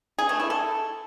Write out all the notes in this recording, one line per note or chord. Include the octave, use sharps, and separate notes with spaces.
G#4
A3
E4
A4